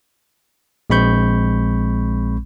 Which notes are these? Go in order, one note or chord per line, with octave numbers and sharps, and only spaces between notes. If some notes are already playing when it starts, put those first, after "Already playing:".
A#1 G#3 C4 B5 C#6 G6